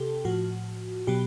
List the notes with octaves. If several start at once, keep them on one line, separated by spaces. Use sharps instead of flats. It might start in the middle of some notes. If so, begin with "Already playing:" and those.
Already playing: C3 G4 A4
A2 F3 F#4
B2 F#3 G4